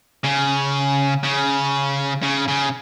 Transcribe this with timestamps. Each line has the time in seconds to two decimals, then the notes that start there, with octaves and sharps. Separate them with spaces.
0.25 C#3
1.24 C#3
2.23 C#3
2.48 C#3